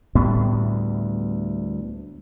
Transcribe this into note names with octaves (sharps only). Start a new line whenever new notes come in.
D2 A2 G3 B3